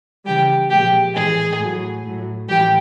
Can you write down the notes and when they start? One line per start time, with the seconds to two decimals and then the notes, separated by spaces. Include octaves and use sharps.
0.25 C#3 E3 G3 G4 G5
0.69 A#2 F3 G#3 G4 G5
1.14 A2 E3 G#3 G#4 G#5
1.59 A2 F#3
2.04 A2 F#3
2.48 A2 E3 G3 G4 G5